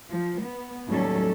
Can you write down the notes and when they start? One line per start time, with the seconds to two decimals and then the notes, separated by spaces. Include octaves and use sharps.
0.10 F3
0.42 B3
0.88 D#2 A2 F#3 G3 C#4 A4